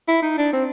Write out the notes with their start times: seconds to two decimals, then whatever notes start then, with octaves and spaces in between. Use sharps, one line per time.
0.08 E4
0.22 D#4
0.38 D4
0.53 C4